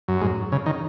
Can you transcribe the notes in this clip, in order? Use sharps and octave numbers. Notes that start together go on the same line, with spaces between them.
F#2
G#2
C#3
D#3